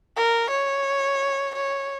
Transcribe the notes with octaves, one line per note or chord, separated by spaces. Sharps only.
A#4
C#5
C#5